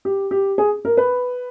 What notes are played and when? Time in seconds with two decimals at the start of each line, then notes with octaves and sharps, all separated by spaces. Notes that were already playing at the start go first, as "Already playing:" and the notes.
0.05 G4
0.31 G4
0.58 G#4
0.85 A#4
0.97 B4